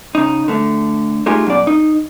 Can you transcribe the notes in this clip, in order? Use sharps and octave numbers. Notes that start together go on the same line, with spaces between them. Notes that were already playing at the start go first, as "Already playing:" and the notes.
C#3 D#4
D3 A3
A3 D#4 F4 G4 G#4
F#2 B2 D5
D#4